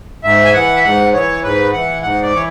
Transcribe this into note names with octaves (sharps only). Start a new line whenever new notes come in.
G#2 E5
G#5
E3 F#5
E5
G#2 F#5
E3 C#5
G#2 B4
E3 F#5
G#2 F#5
D5
E3 C#5